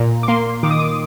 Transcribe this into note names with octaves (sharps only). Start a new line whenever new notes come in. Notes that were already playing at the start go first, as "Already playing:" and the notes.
Already playing: A#2 A#5
D6
A#3 C6
D#3 D6
D#6
D6